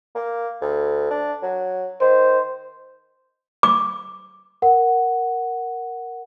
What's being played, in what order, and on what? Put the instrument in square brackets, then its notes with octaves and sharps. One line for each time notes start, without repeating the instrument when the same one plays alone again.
[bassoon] A#3
D2
D4
F#3
[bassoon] D#3 [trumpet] C5
[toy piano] D6
[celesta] A#4 F#5